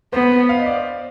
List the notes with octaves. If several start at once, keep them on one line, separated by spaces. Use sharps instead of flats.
B3 C5
F5
D#5
D5
C5